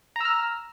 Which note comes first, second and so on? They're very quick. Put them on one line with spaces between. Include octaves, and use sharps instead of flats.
A#5 E6 F6